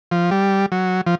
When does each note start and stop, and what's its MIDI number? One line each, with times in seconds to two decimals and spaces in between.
0.11 0.30 53
0.31 0.66 55
0.72 1.01 54
1.06 1.15 53